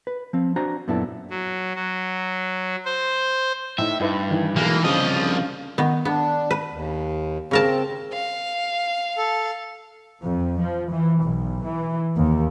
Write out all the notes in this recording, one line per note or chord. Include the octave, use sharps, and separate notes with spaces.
B4
F3 C4
D4 F#4 C5 G#5 A#5
F#2 A#2 B3 D4 E4 A4
F#3
F#3
C5
A2 D#4 E5
G2 D#4 E4 B4
D#3 E3
B1 E3 G#3 A#3
C2 G2 C#3 F3 D#5
D#3 B3
B3 D4
B4
D#2
C#3 C4 A#4 A5
F5
A4
F2
F3
E3
B1
E3
D#2